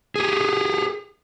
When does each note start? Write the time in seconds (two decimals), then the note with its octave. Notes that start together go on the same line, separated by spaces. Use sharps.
0.16 G4 G#4